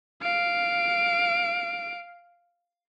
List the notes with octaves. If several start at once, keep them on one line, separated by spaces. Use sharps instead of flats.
F5 D7